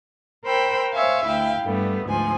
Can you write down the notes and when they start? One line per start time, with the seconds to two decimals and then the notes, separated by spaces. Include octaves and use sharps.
0.45 A#4 C5 G5 B5 E6
0.93 C5 C#5 E5 F5 G#5
1.26 D2 E4 F5 G5
1.62 G2 G3 A3 B3
2.05 D2 G#2 F3 G#5